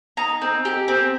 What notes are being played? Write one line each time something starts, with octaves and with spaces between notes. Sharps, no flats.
D#4 A#5
C4
G4
C4